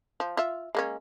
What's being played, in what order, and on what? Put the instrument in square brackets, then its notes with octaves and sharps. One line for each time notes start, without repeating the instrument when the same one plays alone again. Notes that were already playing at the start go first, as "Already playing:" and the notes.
[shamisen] F3
F4 E5
G#3 A#3 C#4